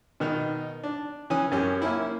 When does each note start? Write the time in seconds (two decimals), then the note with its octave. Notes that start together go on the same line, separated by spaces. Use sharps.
0.20 B2 D#3 D#4
0.84 D4
1.30 E3 C#4 G#5 D#6
1.52 F#2 C#4 G4
1.82 A#3 C#4 E4